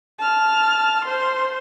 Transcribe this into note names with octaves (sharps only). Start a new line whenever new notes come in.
A5 F6
C5 C6